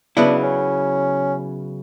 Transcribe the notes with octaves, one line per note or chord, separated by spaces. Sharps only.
C#3 F#3 B3 D4 E4
C#4